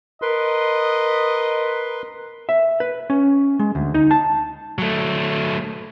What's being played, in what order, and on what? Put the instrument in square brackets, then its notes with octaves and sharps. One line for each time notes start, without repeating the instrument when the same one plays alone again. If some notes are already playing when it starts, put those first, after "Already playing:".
[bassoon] A#4 [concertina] B4 C6 [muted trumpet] D#5
[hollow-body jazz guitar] E5
B4
C#4
G#3
D2
D#4
A5
[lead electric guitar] F#3 A3